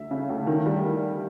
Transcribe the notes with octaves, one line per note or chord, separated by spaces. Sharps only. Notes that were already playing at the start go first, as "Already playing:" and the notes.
Already playing: D2 E5
C#3
D2
D#3
G3